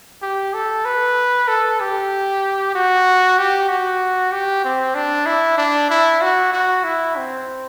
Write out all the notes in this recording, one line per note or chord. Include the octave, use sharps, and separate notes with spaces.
G4
A4
B4
A4
G4
F#4
G4
F#4
G4
C4
D4
E4
D4
E4
F#4
F#4
E4
C4